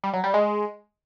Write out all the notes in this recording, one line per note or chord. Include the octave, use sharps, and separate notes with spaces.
G3
F#3
G3
G#3